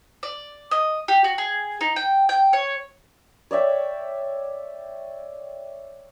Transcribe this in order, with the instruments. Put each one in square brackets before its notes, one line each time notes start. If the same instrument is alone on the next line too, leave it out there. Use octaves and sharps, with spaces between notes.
[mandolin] D5
D#5
G4
F#4
G#4
D#4
G5
G5
C#5
[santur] C#5 D5 E5 G5